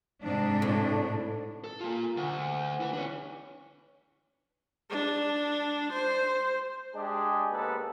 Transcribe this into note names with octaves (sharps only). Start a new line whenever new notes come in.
G#2 C3 D4
A2
A4
A#3 F4
D2
E4 B4
D4 C#5
D4
C5
G#3 D4 G4 G#4
D#2 G#2 B3 A4 B4